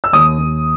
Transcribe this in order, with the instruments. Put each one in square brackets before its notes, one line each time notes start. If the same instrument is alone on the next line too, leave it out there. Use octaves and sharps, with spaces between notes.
[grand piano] E6
D#2 D#6
D#2